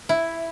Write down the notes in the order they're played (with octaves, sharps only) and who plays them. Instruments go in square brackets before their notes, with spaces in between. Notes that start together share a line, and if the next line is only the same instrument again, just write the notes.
[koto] E4